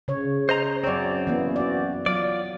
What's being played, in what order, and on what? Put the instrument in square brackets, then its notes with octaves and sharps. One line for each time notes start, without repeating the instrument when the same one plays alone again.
[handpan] C#3 C#5
[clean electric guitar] C5 D#5 A#5
[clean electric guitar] F#2 C4 [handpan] C#5 D5
[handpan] E3 A#3 B3
F#4 D5
[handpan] F#3 [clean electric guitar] F4 D5